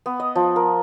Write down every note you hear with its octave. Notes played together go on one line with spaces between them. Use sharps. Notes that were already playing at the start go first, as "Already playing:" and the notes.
B3
D#5
F3
A#4